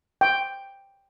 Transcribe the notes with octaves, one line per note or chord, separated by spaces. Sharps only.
G5